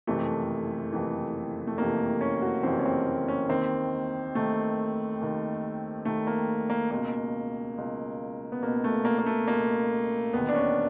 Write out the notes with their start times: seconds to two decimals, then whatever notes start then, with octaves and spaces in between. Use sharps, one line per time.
0.07 F#1 F2 C3 E3 A3
0.92 F#1 F2 C3 E3
1.67 A3
1.78 F#1 F2 C3 E3 A#3
2.21 C#4
2.42 F#4
2.63 F#1 F2 C3 E3 C4
2.79 C#4
2.86 C4
3.28 C#4
3.49 D#2 D#3 C4
4.35 D#2 D#3 A3
5.21 D#2 D#3
6.05 D#2 D#3 A3
6.27 A#3
6.70 A#3
6.91 C#2 B2 A#3
7.77 C#2 B2
8.52 B3
8.62 C#2 B2 A#3
8.84 A3
9.05 A#3
9.19 A#3
9.26 A3
9.47 C#2 B2 A#3
10.33 E1 D#2 D#3 B3
10.49 D4
10.55 C#4